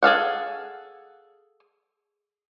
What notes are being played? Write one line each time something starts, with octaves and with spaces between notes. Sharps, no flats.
G#4 A4 F5 F#5